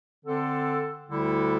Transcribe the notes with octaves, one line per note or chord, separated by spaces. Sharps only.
D3 C4 A4
D2 D3 G3 E4 A4